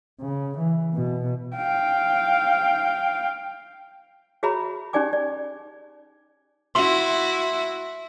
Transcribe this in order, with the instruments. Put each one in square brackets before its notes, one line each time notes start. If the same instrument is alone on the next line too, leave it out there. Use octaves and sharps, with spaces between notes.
[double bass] C#3
E3
B2
[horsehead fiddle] F5 G5
[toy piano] F#4 G#4 C#5 E5 A#5 B5
C#4 D#4 G4 D5 G#5 D6
D5
[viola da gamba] E4 F#4 [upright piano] E5 C6